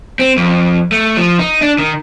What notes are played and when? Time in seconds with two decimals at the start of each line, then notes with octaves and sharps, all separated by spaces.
0.19 C4
0.37 F2
0.92 A3
1.17 F3
1.39 D#4
1.62 D4
1.79 D#3